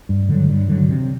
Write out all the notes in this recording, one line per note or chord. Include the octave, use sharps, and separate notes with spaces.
G2
D3 F#3
G2
D3 F#3
C3